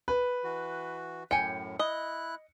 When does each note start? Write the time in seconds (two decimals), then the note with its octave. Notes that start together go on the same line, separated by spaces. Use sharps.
0.08 B4
0.44 E3 F#4
1.31 F#2 A2 G5 G#5 C#7
1.79 E4 D#5 F#6